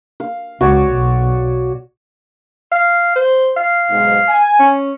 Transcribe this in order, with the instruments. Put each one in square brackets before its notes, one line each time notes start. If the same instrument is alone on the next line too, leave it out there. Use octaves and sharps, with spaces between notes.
[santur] F5
[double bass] C#2 [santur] F#4 C#5 D5
[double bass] B1
[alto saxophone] F5
C5
F5
[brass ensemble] B1 G#2
G#5
[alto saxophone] C#4